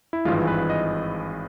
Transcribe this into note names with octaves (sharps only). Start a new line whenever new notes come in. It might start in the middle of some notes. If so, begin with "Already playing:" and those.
E4
G#1 G2 E3 G#3 F4
B4
D#5